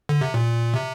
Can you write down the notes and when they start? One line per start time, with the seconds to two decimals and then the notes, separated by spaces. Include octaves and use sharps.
0.09 D3
0.21 C3
0.34 A#2
0.74 C3